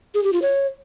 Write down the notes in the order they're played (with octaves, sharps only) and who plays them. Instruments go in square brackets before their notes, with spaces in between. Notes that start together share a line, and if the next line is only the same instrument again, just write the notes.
[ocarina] G#4
G4
F4
C#5